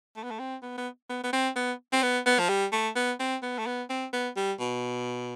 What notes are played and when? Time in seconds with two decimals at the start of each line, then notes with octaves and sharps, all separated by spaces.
0.16 A3
0.23 B3
0.30 A3
0.39 C4
0.62 B3
0.78 B3
1.09 B3
1.24 B3
1.33 C4
1.56 B3
1.93 C4
2.03 B3
2.26 B3
2.39 F3
2.49 G3
2.73 A3
2.96 B3
3.20 C4
3.42 B3
3.59 A3
3.66 B3
3.90 C4
4.13 B3
4.36 G3
4.59 B2